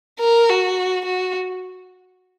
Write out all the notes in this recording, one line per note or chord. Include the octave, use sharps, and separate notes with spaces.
A#4
F#4
F#4